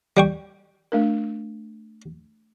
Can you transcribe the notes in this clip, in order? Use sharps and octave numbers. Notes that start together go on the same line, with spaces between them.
G3 G5 C#6
A3 D4 A#4